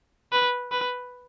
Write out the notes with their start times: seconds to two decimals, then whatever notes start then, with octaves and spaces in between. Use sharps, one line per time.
0.32 B4
0.72 B4